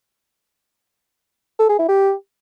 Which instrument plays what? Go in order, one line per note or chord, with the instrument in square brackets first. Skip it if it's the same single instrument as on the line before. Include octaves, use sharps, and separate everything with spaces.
[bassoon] A4
G#4
E4
G4